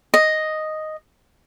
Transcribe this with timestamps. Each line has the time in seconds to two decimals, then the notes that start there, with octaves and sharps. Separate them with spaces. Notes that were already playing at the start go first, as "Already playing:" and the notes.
0.14 D#5